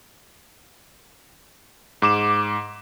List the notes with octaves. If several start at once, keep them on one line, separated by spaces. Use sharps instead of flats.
G#2 D6 E7